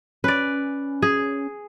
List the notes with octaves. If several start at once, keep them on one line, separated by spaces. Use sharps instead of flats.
C#4 B4 D5
G#4